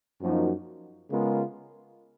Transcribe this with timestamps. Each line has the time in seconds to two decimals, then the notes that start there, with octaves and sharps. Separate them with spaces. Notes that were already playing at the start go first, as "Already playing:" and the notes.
0.21 F#2 F3 A#3 D#4 F#4
1.10 C#3 G#3 B3 F4 A#4